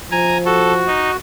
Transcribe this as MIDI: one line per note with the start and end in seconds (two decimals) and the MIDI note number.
0.11 0.89 53
0.11 0.37 80
0.11 0.37 82
0.45 1.17 66
0.45 0.73 69
0.87 1.11 63